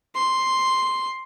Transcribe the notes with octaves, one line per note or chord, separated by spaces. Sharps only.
C6